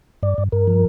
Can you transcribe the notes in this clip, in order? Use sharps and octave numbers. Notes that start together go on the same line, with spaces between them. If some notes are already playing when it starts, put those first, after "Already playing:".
G2 D5
G2
G2 A#4
F3